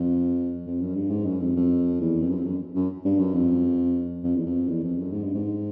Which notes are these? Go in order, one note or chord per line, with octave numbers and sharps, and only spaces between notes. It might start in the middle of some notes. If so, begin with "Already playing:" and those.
Already playing: F2
F2
F#2
G2
G#2
F#2
F2
F2
E2
F2
F#2
F2
F#2
F#2
G2
F#2
F2
F2
E2
F2
E2
F2
F#2
G#2
G2
G#2